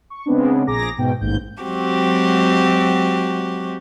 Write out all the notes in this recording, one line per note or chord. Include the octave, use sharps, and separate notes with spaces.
C#6
C#3 G#3 B3 C4 D4
A#1 G#4 A#5 D6 A#6
G#2 B2 G5
A1 D#2 G#2 G6
F#3 G#3 C4 F#4 G4